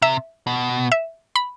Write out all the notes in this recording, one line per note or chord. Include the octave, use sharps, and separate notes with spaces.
C3 E5
B2
E5
B5